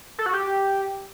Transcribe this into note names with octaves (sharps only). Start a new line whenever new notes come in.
A4
F#4
G4